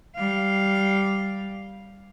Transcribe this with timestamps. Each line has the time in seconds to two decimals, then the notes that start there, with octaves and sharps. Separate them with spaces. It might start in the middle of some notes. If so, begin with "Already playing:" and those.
0.16 G3 F5